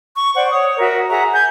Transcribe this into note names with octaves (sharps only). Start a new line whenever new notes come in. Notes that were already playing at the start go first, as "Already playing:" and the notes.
C#6
C5 D5 F#5
C#5 D#6
F#4 A#4 E5
G#4 E5 F#5 A#5
G#5 G6